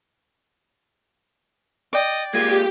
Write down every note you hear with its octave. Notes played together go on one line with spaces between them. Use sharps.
D5 D#5 G5
G#3 A#3 F4 G4 G#6